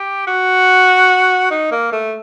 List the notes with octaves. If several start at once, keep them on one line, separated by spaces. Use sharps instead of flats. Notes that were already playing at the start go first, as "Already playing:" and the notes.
Already playing: G4
F#4
D#4
A#3
A3